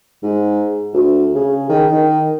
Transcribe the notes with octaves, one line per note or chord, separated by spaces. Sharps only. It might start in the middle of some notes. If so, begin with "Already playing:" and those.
G#2
D2
C#3
D#3
D#3